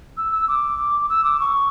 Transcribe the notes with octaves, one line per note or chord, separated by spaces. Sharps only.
E6
E6
D6
E6
D6
C#6